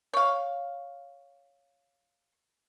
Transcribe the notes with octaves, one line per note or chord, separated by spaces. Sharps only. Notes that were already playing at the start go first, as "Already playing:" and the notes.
C#5 F5